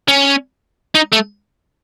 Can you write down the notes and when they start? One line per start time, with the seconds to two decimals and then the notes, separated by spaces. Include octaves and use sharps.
0.08 C#4
0.95 D#4
1.13 A3